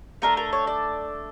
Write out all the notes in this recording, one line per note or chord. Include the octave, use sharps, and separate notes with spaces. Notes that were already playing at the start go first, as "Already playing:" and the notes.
A3 D4 A4 A#4
A#4
C#5
D5